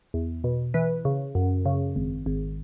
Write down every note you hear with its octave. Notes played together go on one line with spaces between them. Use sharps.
E2
B2
E3 B4
C#3
F#2
C#3
G#1
G#1